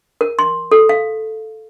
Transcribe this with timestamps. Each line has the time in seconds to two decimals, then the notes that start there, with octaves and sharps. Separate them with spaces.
0.21 A#4
0.39 C6
0.72 A4
0.89 F5